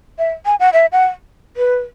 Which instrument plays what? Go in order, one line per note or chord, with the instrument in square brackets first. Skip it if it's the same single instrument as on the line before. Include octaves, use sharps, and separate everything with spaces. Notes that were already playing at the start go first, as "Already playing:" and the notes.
[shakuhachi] E5
G#5
F#5
E5
F#5
B4